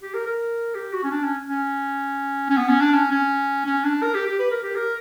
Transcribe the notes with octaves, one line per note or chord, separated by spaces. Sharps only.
G4
A#4
A#4
G4
F#4
C#4
D4
C#4
C#4
C#4
B3
C#4
D4
C#4
C#4
C#4
D4
A#4
G4
G4
B4
A#4
G4
A#4